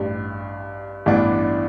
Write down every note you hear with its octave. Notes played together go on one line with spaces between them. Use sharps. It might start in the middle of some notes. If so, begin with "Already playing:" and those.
Already playing: A1 G2 G3
A1 G2 E3 B3 D4